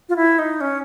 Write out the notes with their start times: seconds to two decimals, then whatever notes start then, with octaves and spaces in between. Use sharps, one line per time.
0.09 F4
0.16 E4
0.39 D#4
0.61 C#4